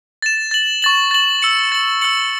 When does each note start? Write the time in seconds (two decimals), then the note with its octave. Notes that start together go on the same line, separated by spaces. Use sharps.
0.22 A6 E7
0.51 A6 F#7
0.82 C#6 A6 F#7
1.11 A6 F#7
1.42 E6 C#7 F#7
1.72 A6 F#7
2.01 E6 C#7 F#7